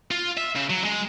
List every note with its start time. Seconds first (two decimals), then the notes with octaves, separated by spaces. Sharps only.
0.11 F4
0.37 E5
0.55 C#3
0.70 F#3
0.84 G#3